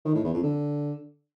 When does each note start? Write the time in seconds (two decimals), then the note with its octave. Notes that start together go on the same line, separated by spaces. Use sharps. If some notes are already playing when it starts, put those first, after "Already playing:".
0.05 D#3
0.14 A2
0.24 E2
0.34 F2
0.43 D3